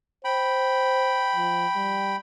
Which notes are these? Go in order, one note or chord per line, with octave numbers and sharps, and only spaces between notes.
C5 G5 B5
F3
G3